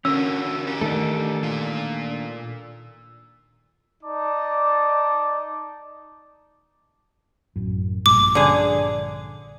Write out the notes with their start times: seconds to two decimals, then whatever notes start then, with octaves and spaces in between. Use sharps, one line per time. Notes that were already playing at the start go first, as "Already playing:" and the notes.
0.05 D3 E3 C#4 F#4 A#4 E6
0.67 E3 G4
0.81 D#3 A3 D4 A4
1.43 A#2 F4
4.04 D#4 D5 A5 D6
7.56 A1 F#2
8.06 A#1 G2 A#2 D6
8.35 D3 G#4